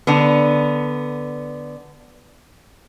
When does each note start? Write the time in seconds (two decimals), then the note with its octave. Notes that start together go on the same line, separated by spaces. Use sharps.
0.07 D3 B3